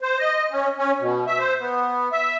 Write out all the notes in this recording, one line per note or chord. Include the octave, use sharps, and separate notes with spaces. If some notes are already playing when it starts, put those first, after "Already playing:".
C5
D#5
C#4
C#4
B2
E5
C5
B3
E5